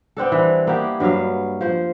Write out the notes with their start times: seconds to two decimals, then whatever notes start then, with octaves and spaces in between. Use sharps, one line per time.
0.17 B3 C4 D4 A4
0.32 E3 G3
0.67 A#3 B3 E4 G4
1.00 G2 F#3 E5 F5
1.61 F3 C5